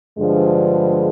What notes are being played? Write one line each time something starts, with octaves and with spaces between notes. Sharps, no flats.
G2 D3 F3 G#3